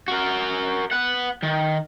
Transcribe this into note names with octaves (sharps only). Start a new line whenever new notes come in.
F#4 A#4
B3 F#5
D#3